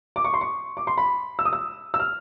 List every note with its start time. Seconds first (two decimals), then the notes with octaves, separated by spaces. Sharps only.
0.16 D6
0.24 C#6
0.34 C6
0.41 C#6
0.77 D6
0.87 C6
0.98 B5
1.39 E6
1.45 D#6
1.53 E6
1.94 E6
2.00 F6